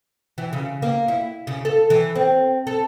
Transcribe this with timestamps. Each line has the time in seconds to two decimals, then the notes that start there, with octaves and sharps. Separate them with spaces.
0.38 E3
0.53 C#3
0.82 A#3
1.08 E4
1.47 C#3
1.65 A4
1.90 E3
2.15 C4
2.67 A4